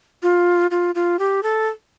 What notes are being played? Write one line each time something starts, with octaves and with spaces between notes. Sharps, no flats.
F4
F4
F4
G4
A4